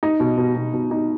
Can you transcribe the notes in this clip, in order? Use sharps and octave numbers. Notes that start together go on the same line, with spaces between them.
D#4
B2
B2
B2
B2
D#4